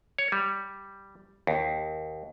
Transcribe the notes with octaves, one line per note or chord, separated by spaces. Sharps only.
C#5
G3
D#2